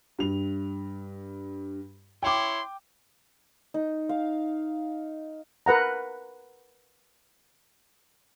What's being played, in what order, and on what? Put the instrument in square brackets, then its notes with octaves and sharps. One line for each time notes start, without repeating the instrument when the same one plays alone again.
[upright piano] G2 F7
[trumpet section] E4 C#5 C6 [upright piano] G5 D6
[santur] D#4
F5
[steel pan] A#4 B4 F#5 A#5